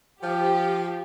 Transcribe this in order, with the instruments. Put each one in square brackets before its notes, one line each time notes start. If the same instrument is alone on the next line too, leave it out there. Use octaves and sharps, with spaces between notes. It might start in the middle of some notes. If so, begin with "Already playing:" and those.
[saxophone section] F3 [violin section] G4